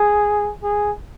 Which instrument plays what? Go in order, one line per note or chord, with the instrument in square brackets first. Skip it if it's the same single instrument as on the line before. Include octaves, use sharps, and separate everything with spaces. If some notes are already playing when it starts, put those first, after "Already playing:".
Already playing: [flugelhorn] G#4
G#4